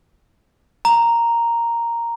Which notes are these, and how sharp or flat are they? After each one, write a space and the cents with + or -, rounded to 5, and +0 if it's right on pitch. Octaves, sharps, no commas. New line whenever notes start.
A#5 +0